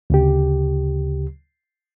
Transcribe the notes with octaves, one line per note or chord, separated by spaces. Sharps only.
D2 C#3 G4